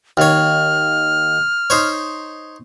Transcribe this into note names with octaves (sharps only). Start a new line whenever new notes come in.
D#2 C#5 F6
D#4 C5 C#5